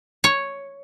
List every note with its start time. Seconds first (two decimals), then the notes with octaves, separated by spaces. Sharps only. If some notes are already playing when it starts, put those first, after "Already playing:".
0.24 C#5